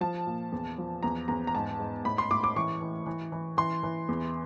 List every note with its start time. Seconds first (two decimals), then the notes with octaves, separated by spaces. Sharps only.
0.01 F3 A5
0.27 A#2
0.52 E2
0.78 F3
1.03 E2 A#5
1.28 E2 A#5
1.47 A#5
1.55 G#2 A5
1.80 G#2
2.04 A2 B5
2.18 C6
2.31 A2 D6
2.44 D6
2.56 E3 C#6
2.81 E3
3.06 E3
3.32 E3
3.57 E3 C6
3.83 E3
4.08 E2